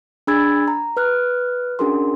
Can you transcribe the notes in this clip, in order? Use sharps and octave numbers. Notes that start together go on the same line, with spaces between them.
D4 G#4 B5 E6 G#6 A6
A#5
B4 F6 F#6
C#4 D4 F#4 G#4 A#4 C6